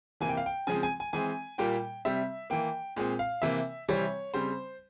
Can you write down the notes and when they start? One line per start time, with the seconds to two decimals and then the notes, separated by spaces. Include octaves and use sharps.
0.21 C3 E3 A#3 G#5
0.29 G5
0.37 F5
0.46 G5
0.67 C#3 F3 G#3 C4 G#5
0.83 G#5
1.00 G#5
1.13 E3 G#3 C4 G#5
1.58 A#2 G3 A#3 G5
2.05 C3 G3 C4 E5
2.50 E3 A#3 G5
2.96 A#2 G#3 C4
3.19 F5
3.42 C3 E3 A#3 E5
3.88 C3 E3 G3 C4 C#5
4.34 C#3 G3 C4 C5